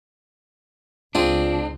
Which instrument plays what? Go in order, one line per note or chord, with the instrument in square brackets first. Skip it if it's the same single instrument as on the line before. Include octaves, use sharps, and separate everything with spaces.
[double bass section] C#2 [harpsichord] C4 G#4 [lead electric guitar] D4 [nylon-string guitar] F4